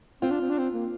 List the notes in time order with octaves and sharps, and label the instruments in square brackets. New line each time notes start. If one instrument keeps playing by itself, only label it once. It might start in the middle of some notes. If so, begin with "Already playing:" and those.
[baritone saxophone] C4 [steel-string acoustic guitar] F4
[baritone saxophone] D4
C4
D4
C4
A#3